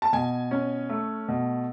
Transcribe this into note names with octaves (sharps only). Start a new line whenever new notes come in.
A5
B2 G#5
C#4
A3
B2